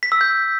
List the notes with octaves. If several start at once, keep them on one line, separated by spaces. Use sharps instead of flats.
B6
E6
G6